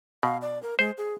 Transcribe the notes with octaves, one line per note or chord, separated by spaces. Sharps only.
B2 F5
D5
A#4
G#3 C5
G#4